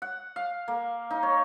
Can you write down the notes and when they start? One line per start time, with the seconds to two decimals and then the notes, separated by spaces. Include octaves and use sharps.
0.02 F#5
0.36 F5
0.68 A#3
1.11 D#4
1.23 C#5